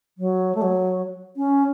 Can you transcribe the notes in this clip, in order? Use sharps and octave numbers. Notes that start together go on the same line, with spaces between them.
F#3
A3
F#3
C#4